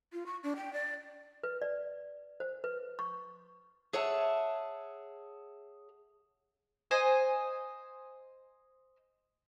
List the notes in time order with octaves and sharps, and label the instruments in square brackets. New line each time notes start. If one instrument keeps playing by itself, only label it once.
[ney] F4
C#6
D4
G5
D5
[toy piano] B4
D5
C5
B4
C#6
[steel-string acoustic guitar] G#4 C#5 E5 F#5 A5
[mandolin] C5 D#5 G#5